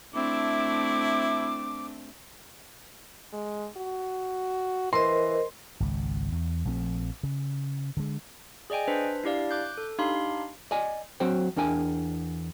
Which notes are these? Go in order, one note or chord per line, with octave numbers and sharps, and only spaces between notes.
A3 C4 D4 E4 D6
G#3
F#4
E3 A#4 C5 D#5 C6
G#1 C#2
E2
A#1 F3 A3 C4
C#3
D3 G#3
G#4 D5 D#5 G5 G#5
D4 B4 C5 B6
D4 E4 G4 D5 F5
D6 F#6 G6
A4
D4 D#4 G4 F5 B5 C6
D5 D#5 G#5
F#3 C4 F#4 C5 G5
E2 D4 A#4 G5 G#5